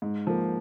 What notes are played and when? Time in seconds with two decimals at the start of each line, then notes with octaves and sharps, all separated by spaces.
0.02 G#2
0.27 F3 A#3